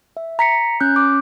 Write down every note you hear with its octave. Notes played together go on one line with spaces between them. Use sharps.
E5
A#5 B6 C#7
C#4 F#6 G6
D6